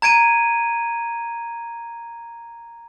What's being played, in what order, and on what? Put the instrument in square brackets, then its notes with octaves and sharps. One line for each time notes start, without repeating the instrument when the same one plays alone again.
[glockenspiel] A#5 G#6 D7 D#7